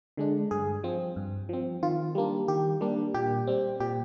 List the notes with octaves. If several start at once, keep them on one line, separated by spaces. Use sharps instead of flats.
D3 G#3 D4
G2 G#4
F3 C4
G2
F3 C4
D#3 F4
G3 A#3 D4
D#3 G4
G3 A#3 D4
A#2 G4
G3 C4
A#2 G4